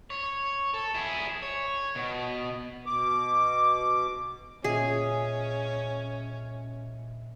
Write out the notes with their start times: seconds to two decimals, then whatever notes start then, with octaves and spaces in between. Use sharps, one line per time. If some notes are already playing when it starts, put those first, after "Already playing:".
0.10 C#5
0.74 A4
0.95 E4 G#4
1.42 C#5
1.95 B2
2.86 B2 D6
4.64 A#2 C#4 G#4 D#5 E5